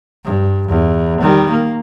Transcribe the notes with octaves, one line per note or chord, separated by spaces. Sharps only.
G2
E2
D#3 G3
A#3